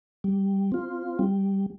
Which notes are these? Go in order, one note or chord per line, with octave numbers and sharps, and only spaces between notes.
G3
C4 F4
G3